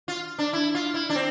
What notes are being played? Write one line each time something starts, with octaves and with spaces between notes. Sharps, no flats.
F4
D4
E4
F4
E4
D4
C4